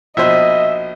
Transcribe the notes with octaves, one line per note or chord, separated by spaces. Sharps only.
A#1 B2 C5 D#5 E5